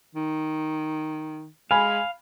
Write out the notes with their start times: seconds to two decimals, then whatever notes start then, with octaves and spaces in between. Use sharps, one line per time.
0.15 D#3
1.71 G#3 F5 G#5 B5